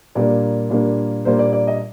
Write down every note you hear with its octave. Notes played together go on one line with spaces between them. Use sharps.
A#2 G3 A#3 D4 D5
A#2 G3 A#3 D4
A#2 G3 A#3 D4 C5
D5
D5
D#5